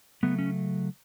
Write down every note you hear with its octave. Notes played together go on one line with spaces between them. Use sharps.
C#3 F#3 A3 B3
C#4